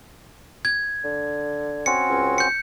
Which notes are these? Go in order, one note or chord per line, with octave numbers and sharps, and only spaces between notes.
G#6
D3
C4 C#4 F#4 C#7
C#2
G6 C#7